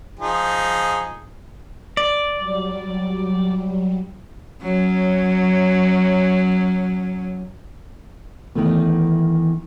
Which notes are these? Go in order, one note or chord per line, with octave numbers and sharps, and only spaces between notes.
F3 D#4 G#4
D5
F#3 G3
F#3 C#4
D#3 E3 A3 B3